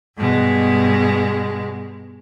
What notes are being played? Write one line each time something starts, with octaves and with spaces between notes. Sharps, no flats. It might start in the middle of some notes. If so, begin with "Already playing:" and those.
G2 B2 G#3